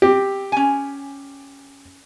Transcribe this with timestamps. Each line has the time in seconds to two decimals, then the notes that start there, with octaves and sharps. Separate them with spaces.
0.02 C4 G4
0.52 C#4 G#5